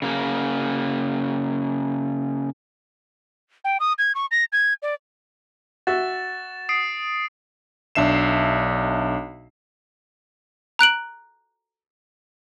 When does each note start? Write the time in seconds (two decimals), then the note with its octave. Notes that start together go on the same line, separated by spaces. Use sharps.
0.02 C#3 A#3
3.64 G5
3.80 D#6
3.98 G#6
4.15 C#6
4.31 A#6
4.52 G#6
4.82 D5
5.87 F#4 E5 A6 E7
6.69 D#6 C7 D7
7.95 B1 D4 E5 C7 E7
10.79 A#5 F#6 D7 F#7